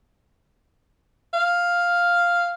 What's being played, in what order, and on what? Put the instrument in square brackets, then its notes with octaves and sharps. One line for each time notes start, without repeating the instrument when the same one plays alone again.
[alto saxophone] F5